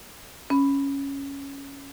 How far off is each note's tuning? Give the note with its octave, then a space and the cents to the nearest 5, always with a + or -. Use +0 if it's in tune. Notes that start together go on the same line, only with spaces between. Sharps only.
C#4 +0 B5 +5